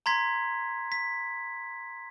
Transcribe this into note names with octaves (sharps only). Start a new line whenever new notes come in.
A#5 C6 G#6 B6
B6